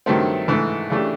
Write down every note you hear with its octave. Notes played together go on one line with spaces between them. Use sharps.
G2 D#3 F#3 A3 C4
G#2 E3 A3
C#3 E3 A3 D4 G4